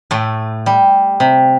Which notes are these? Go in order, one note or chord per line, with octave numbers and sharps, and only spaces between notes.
A2 A3
G3
C3